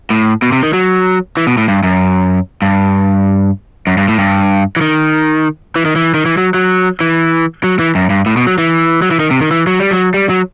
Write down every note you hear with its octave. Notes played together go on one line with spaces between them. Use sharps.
A2
B2
C3
D#3
F#3
E3
B2
A2
G2
F#2
G2
F#2
G2
A2
G2
E3
D#3
E3
D#3
E3
D#3
E3
F#3
F#3
E3
F#3
E3
F#2
G2
A2
B2
F#3
E3
F#3
E3
D#3
C3
D#3
E3
F#3
G3
F#3
G3
F#3